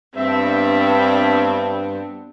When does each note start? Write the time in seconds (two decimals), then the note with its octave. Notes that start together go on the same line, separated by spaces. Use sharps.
0.16 G2 B3 C4 D4 E5